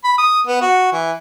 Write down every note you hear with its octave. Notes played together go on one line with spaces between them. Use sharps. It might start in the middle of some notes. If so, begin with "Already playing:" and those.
B5
D#6
B3
F#4
E3